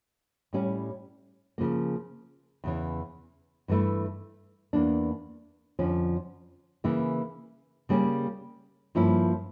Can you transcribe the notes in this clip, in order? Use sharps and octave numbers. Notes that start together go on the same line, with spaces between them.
A2 G3 C#4 E4
C#3 F3 A#3
E2 C#3 E3
G2 E3 A3 E4
E2 E3 A#3 D4
F2 D3 F3 C#4
C#3 E3 A#3 E4
C#3 G3 A#3 C#4
G2 F3 A#3 C#4 E4